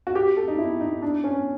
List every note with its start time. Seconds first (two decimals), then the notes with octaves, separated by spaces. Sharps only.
0.07 F#4
0.15 G4
0.37 A4
0.48 D#4
0.58 E4
0.81 D#4
1.02 D4
1.24 C#4